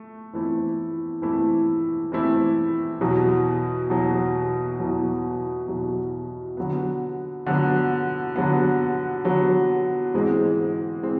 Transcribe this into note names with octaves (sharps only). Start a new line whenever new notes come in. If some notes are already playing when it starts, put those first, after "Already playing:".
Already playing: A3
E3 A3 C4 E4
E3 A3 C4 E4
E3 A3 C4 E4
E2 B2 F#3
E2 B2 F#3
E2 B2 F#3
E2 B2 F#3
D3 F#3 B3
D3 F#3 B3
D3 F#3 B3
D3 F#3 B3
G#2 E3 G#3 C4
E3 G#3 C4